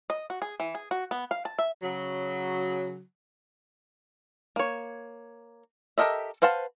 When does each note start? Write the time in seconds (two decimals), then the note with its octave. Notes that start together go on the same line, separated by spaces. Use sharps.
0.10 D#5
0.30 F#4
0.42 G#4
0.60 E3
0.75 G#4
0.91 F#4
1.11 B3
1.31 F5
1.45 A5
1.59 E5
1.83 C#3 F#3
4.56 A#3 C#5
5.98 G4 A4 A#4 D#5 E5
6.42 B4 C5 F5 F#5 A5